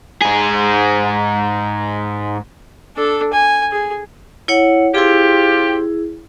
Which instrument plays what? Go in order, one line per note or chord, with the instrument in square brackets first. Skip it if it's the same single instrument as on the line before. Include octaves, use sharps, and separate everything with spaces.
[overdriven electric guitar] G#2 G#4
[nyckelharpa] D4 A4
G#5
G#4
[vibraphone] E4 C#5 F#5
[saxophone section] C4 F4 G4 [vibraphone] E4 G#4